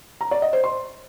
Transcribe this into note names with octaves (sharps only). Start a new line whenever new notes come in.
A#5
D5
D#5
C5
C6